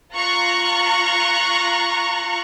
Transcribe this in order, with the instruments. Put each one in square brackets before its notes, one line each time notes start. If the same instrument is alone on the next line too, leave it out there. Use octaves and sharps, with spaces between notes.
[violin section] F4 A#5 C#6 F#6